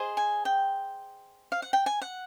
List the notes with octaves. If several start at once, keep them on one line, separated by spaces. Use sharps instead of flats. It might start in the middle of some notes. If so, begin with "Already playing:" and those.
Already playing: G#4 C5 D#5
G#5
G5
F5
F#5
G5
G#5
F#5